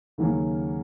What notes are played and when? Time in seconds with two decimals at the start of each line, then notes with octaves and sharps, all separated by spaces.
0.18 D#2 C#3 F#3 A#3 C#4